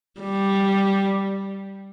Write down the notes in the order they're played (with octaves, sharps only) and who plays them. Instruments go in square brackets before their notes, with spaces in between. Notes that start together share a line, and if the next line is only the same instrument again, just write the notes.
[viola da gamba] G3